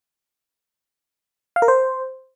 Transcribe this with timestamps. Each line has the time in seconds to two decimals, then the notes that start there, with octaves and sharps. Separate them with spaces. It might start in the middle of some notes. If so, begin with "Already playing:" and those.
1.56 F5
1.62 A#4
1.68 C5